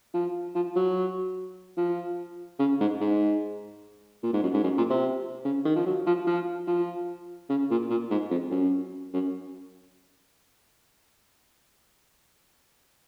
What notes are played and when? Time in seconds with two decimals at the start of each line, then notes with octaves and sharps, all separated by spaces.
0.14 F3
0.55 F3
0.76 F#3
1.77 F3
2.59 C#3
2.80 G#2
3.01 G#2
4.23 A#2
4.33 G#2
4.43 F#2
4.54 G#2
4.63 F#2
4.78 A#2
4.90 C3
5.45 C#3
5.65 D#3
5.76 F3
5.86 F#3
6.06 F3
6.27 F3
6.67 F3
7.49 C#3
7.71 A#2
7.90 A#2
8.10 G#2
8.31 F2
8.51 F#2
9.13 F#2